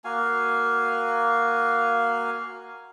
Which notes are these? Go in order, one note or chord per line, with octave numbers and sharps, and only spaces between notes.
A#3 F#4 F5 G#5